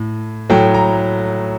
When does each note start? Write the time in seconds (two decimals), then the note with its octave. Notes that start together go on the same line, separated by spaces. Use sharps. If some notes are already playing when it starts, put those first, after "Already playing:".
Already playing: A2
0.50 A2 F#3 A3 G5
0.74 A#5